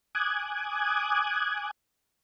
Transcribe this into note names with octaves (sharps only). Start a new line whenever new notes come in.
G#5 D6 D#6 F#6 G#6